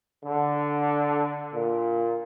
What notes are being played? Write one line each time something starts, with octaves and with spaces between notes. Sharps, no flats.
D3
A#2